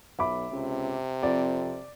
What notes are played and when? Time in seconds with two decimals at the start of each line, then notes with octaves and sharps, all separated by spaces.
0.19 B1 E5 B5 D6
0.52 C#2 C3
1.23 F2 D5